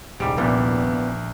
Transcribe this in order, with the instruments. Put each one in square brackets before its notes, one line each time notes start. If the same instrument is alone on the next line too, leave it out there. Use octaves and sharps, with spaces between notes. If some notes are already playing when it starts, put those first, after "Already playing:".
[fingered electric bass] D#1 C2 [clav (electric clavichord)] G#2 G3 [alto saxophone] G4
[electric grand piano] A#1 [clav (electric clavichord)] A#2 E3 G3 [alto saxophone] B3